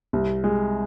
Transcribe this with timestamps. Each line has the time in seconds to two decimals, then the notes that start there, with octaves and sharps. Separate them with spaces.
0.13 C2
0.44 G#3